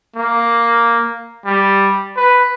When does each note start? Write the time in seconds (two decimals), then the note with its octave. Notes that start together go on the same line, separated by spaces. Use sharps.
0.16 A#3
1.46 G3
2.17 B4